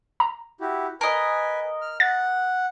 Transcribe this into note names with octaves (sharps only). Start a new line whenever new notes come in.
A#5
E4 F#4 G4
A#4 B4 D#5 G#5
F6
F#5 A6